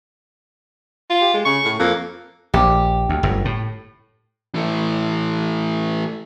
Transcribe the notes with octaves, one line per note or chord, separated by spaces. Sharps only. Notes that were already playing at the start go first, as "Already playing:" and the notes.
F4
G4
G#3
C#3 C#6
A2
F2 A#3
A#1 G4
D2
G1 F#2
A2
E3 A3